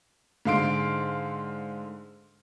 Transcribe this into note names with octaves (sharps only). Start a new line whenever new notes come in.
G#2 D3 F5 C6 D7